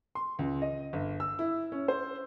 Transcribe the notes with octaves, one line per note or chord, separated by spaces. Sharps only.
C6
C#2
D#5
G1
E6
E4
C#4
C5